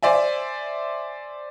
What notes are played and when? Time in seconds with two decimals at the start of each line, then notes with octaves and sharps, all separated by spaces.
0.03 C5 D5 E5 G#5